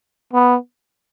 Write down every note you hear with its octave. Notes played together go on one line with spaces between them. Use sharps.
B3